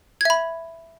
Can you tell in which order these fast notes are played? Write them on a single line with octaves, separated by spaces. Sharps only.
G#6 E5 B5